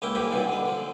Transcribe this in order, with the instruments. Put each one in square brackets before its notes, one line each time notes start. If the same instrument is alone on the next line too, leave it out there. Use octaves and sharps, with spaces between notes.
[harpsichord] C#2 A#3 C#4 E4 G5
C2 A2 E3 A#3 G4 B5
G2 A#2 D#3 E3 F#3
D3 B3
D3 F3